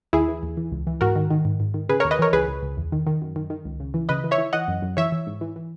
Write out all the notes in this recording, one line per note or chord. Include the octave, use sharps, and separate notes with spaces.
D#2 E4 G#4
E3
D#2
E3
C#2
E3
G#2 F#4 A#4
D#3
D#3
G#2
G#2
D#3
C#3 G#4 B4
A#4 C#5
D#2
B4 D#5
E3 A#4 C#5
C#2 G#4 B4
C#2
C#2
E2
D#3
D#3
F#2
D#3
D#3
C#2
C#3
E3
C#3 B4 D#5
E3
C#5 E5
E3
E3 D#5 F#5
F#2
F#2
E3 C#5 E5
E3
G#2
E3
E3